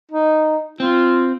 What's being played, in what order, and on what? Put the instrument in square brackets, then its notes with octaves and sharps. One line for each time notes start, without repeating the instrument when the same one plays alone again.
[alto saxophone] D#4
[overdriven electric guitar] C4 [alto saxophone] F4